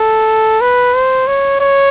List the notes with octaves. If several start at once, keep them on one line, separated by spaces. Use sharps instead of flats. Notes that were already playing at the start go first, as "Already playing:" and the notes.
Already playing: A4
B4
C5
C#5
C#5